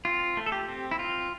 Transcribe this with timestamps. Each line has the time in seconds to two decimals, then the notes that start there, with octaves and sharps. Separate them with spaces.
0.05 C4 F4
0.37 A3
0.46 A4
0.52 G4
0.68 C4
0.91 E4
0.99 C4 F4